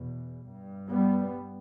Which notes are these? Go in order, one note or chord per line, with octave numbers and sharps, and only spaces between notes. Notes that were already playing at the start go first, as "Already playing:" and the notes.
Already playing: E2 B2
G2
G3 B3